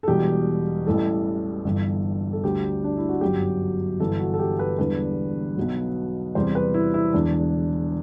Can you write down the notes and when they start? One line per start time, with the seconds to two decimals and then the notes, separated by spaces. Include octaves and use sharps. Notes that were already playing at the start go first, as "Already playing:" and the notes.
0.03 A4
0.08 E1 E2 B2 G3 G4
0.86 A1 A2 E3 G3 A4
1.64 G1 G2 E3
2.33 A4
2.43 D2 D3 G3 G4
2.84 D4
2.97 E4
3.09 F#4
3.21 G1 F#2 F#3 G4
4.00 G1 G2 E3 A4
4.19 F#4
4.34 A4
4.39 G4
4.59 B4
4.79 E1 E2 D3 G3 B4
5.57 B1 B2 F#3
6.35 E2 C3 G3 C5
6.55 B4
6.74 E4
6.94 E4
7.13 E1 E2 D3 D4